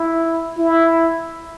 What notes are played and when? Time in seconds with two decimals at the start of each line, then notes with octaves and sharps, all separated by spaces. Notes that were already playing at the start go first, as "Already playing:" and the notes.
Already playing: E4
0.58 E4